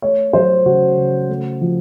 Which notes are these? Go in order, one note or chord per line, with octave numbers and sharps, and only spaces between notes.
A3 C#5
F#3 C5
C#3 F#4
C#3
A3
F3